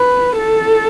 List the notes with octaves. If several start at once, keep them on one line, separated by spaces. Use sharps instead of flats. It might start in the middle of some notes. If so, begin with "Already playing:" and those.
Already playing: B4
A4